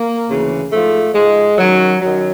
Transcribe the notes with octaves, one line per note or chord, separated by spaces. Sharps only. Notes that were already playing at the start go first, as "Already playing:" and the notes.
Already playing: A#3
D2 C#3 E3
G#2 F3 A3
G#2 F3 G#3
F#2 D#3 F#3
F#2 D#3 F#3